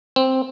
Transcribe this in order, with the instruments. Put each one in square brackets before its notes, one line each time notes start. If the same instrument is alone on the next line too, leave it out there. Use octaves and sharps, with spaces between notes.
[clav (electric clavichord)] C4